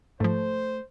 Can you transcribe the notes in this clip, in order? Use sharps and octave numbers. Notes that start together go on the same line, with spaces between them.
G#2 F3 A3 C5